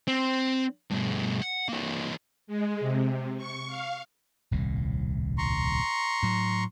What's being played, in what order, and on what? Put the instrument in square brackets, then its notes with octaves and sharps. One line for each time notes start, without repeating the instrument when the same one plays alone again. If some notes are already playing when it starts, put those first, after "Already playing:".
[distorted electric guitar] C4
G2 B2
F#5
E3 A#3
[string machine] G#3
C3
C#6
F5
[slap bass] D#1 C2 A2
[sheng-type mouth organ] A#5 C6 C#6
[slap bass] A2 F#3